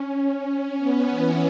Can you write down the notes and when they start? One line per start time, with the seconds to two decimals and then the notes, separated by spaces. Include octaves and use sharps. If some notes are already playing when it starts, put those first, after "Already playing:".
Already playing: C#4
0.77 B3
1.10 E3